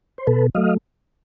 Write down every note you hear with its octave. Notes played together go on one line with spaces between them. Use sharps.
C5
B2 A4 B4
F#3 A3 D#5 F5